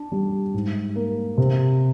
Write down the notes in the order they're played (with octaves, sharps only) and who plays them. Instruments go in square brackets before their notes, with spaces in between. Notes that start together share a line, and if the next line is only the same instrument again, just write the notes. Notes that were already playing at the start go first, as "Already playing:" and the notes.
Already playing: [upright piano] D4
G3
G#2
A#3
C3